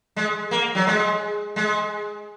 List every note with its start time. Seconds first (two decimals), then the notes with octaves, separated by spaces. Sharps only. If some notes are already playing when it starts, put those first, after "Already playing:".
0.16 G#3
0.51 A#3
0.75 F#3
0.87 G#3
1.56 G#3